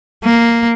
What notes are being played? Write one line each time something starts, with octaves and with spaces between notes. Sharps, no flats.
A#3